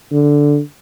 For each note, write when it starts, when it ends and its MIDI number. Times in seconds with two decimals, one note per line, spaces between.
0.12 0.59 50